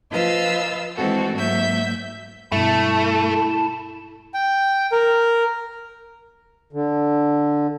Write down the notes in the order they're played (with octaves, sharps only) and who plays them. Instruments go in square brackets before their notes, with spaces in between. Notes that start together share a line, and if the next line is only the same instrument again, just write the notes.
[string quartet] F3 F4 B4 D#5 F5 E6
E3 G#3 C4 F#4 A4
G#2 F#3 A#3 E5 G6
[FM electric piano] G2 B2 [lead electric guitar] A3 [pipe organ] E4 A5
[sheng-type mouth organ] G5
A#4
[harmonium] D3